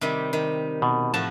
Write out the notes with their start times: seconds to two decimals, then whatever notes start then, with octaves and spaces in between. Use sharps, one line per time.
0.01 C3 D#3 G3
0.33 D#3
0.82 B2
1.14 A2 F3 F#4 A5